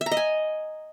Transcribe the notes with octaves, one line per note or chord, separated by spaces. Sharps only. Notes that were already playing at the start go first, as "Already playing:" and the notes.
E5
A#5
D#5
G#5